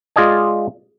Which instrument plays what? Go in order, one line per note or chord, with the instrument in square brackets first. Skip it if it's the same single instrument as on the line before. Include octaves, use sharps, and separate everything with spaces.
[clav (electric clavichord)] G#3 F4 G#4 D5 D#5 G#5